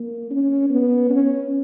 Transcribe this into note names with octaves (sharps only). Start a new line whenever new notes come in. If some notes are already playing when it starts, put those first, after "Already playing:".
Already playing: A#3
C#4
B3
C#4